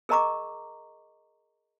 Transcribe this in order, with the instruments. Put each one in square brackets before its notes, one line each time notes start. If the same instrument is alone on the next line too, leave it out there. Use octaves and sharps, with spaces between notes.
[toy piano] G#4 A#4 D#5 A#5 C#6 D6